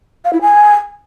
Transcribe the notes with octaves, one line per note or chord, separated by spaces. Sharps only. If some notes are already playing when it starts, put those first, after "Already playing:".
F5
E4
G#5